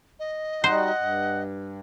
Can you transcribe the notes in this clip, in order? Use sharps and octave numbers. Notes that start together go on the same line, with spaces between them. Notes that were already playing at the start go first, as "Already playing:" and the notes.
D#5
G3 D#4 F#4 C5 F#5
G2